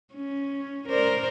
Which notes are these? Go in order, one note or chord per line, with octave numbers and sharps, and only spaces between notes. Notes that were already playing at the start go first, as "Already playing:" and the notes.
C#4
A#4 C5 D5